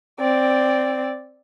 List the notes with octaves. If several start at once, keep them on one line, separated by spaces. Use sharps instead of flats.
C4 D5